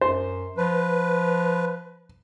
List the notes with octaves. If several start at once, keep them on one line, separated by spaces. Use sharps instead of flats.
F#2 C5
F3 B4